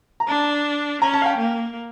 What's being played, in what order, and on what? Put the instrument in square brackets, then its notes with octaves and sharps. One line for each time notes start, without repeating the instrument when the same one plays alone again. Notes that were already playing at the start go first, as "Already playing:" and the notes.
[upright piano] A#5
[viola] D4 [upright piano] A5
[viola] C#4 [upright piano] A#5
[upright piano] A5
F5
G5
[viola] A#3